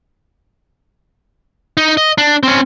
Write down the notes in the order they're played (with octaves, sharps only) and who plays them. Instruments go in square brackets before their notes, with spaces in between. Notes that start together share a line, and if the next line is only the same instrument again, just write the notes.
[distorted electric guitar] D#4
D#5
D4
C4 C#4